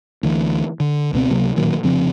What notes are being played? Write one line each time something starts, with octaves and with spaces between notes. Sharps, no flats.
D2 E3
D3
C#2 B2 C4
C#2 C3 F#3 A#3
A1 A#2 D#3 F#3
F1 C#3 F3 C4